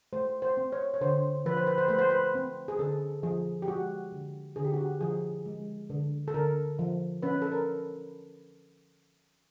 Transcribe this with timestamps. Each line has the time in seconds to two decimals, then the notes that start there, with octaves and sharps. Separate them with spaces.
0.13 A3 C5
0.42 C5
0.57 C4
0.72 C#5
0.94 C#5
1.01 D3 C5
1.45 F3 B4
1.57 C5
1.67 B4
1.78 C5
1.88 A3 B4
1.98 C5
2.10 B4
2.35 C4
2.68 G#4
2.79 D3 A4
3.23 F3 G#4
3.62 G4
3.67 G#3 F#4
4.12 D3
4.56 D3 G#4
4.65 G4
4.74 F#4
4.81 G4
5.01 F3 G#4
5.46 G#3
5.90 D3
6.28 A4
6.34 D3 A#4
6.79 F3
7.23 C#4 B4
7.42 A4
7.52 A#4